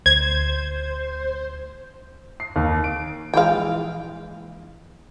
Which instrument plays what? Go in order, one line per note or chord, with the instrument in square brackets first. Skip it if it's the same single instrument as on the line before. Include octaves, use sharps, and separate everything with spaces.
[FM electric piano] D2 [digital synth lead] C5 [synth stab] G#6
[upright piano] C7
D#2
D7
[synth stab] A#1 E3 G#3 [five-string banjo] F5 G5